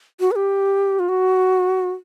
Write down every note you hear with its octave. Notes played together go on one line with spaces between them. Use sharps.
F#4
B4
G4
F4
F#4